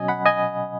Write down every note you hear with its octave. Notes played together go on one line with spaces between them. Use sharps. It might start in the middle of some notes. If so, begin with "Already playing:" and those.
Already playing: B2 F#3 C#4 D#5 G#5
F#5 B5
D#5 G#5